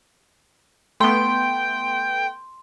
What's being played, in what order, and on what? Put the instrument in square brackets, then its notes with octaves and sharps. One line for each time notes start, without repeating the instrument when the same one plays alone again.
[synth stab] A3 B3 [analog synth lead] G5 [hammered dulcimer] C6